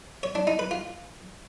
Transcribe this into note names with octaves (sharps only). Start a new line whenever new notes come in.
C#5
D4
D#4
B4
F4